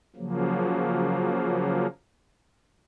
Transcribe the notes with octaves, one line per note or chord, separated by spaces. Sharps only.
C#3 F3 F#3 A#3